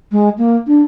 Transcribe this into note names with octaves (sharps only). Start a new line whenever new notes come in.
G#3
A#3
D4